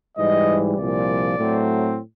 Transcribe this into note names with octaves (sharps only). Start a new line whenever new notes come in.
G#2 E3 G3 D#5
C2 A#2 F3 D5
A2 F#3 A3 C4